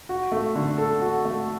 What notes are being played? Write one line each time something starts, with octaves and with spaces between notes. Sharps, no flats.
F#4
A3
D3
A4
F#4
A3